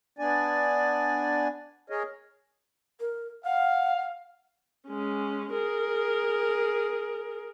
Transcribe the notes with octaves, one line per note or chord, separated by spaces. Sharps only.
B3 D4 D5 G#5
G#4 A#4 C#5 D#5
A#4
F5 F#5
G#3 C#4
G#4 A#4